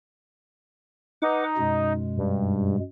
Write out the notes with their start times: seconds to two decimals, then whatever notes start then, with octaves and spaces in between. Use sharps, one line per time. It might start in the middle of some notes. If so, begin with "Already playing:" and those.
1.22 D#4 B4 F#5 D6
1.58 F#2 B2 G#3
2.17 G2